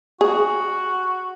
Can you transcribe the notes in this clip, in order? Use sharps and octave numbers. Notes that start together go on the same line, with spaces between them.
F#4 G#4